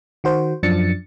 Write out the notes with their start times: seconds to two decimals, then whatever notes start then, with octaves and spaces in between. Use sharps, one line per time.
0.24 D#3 F#4 C5
0.63 F#2 F3 D4 A6 C#7